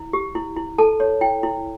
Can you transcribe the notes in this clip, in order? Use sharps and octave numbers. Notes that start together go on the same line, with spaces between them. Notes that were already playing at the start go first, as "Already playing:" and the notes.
Already playing: E4
G4
E4
E4
A4 A5
C#5
E4 G5
E4